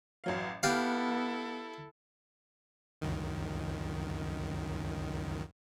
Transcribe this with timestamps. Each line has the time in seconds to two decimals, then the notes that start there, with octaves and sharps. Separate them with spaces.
0.24 A1 F#3 F5
0.63 B3 E4 G4 A4 F5 F6 F#6 A6
3.01 C#2 F#2 D#3